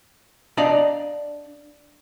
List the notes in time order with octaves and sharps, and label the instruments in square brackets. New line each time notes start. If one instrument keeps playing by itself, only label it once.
[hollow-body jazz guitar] D4 D5 D#5 F5 A#5